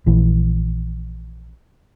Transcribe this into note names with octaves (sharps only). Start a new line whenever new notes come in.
A#1 E3